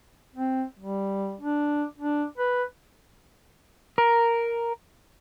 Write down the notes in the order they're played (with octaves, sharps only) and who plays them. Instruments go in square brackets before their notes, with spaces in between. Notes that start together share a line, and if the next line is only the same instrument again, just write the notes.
[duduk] C4
G3
D4
D4
B4
[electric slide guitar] A#4